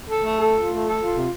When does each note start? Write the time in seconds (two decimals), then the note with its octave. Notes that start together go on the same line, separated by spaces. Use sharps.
0.08 A4
0.24 A3
0.38 A4
0.54 F4
0.69 A3
0.85 A4
0.99 F4
1.16 C3